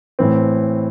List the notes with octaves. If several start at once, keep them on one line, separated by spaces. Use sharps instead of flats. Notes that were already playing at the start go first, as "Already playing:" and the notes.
A2 E3 C4